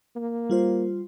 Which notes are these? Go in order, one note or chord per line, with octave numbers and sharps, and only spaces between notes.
A#3
G3 F4 C5